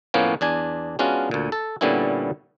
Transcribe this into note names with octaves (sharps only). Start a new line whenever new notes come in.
A2 F3 A#3 B3 C#4
E2 D4 G#5
G#3 B3 C#4 D4 F4 F#4
D2 A#2
A4
A#2 D3 G3 B3 C#4 E4